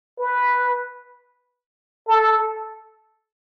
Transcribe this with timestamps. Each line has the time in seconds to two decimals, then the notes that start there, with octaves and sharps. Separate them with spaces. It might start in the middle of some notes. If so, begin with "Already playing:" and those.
0.20 B4
2.08 A4